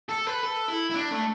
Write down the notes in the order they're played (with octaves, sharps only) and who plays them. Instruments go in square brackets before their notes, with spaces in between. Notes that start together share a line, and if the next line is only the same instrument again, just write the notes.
[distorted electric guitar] A4
B4
A4
E4
E4
D4
A3